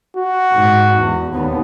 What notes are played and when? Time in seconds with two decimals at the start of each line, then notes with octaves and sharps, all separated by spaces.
0.17 F#4
0.51 G#2
0.96 E2
1.32 D#2 B3